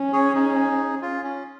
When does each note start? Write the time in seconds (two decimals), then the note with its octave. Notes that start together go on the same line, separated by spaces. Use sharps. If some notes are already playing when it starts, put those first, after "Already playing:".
Already playing: C#4
0.13 G#4 C#5
0.35 D#4 G#4
1.02 F4
1.24 C#4